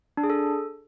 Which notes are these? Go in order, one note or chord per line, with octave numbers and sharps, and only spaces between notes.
D4
G#4
A4